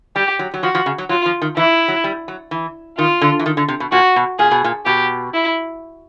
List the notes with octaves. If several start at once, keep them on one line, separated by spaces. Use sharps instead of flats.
G3 G4
F#3
F#3
F3 F#4
F3
C#3
F#3
F#3 F4
F3
D#3
E3 E4
F#3
G3
F#3
E3
D#3 F4
D3
E3
D#3
D3
C3
B2
A#2 F#4
B2
A#2 G#4
B2
A#2
B2 G4
E4